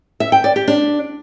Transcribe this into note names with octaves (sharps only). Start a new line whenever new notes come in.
E5
G5
D5
G4
D4